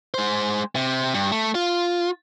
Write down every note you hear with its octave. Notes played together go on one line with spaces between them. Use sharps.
G#3 C5
C3
G2
A3
F4